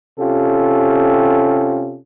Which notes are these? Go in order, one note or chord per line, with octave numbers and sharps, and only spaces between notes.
C3 C#4 F4 G4 A4